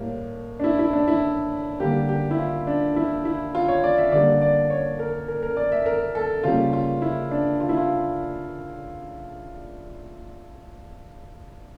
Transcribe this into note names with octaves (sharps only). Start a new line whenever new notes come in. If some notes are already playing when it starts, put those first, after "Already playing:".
Already playing: A2 G3 A#3
D4
E4
E4
D4
E4
D3 G3 A#3 G4
G4
E4
F4
D4
E4
E4
F4
C#5
D5
E5
D3 G3 A#3 D5
D5
C#5
A#4
A#4
A#4
D5
E5
A#4
A4
C#3 G3 A#3 F4
F4
E4
D4
F4
E4
F4